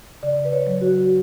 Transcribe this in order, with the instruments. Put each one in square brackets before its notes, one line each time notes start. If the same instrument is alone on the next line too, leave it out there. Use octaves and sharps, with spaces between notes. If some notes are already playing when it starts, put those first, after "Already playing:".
[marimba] C#3 D5
B4
C#5
F#3
F#4